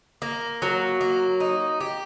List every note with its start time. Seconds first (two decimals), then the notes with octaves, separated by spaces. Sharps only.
0.22 A#3
0.62 F#3
1.01 A#3
1.40 D#4
1.80 G4